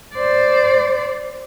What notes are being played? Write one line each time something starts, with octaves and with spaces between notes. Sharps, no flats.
C5 D5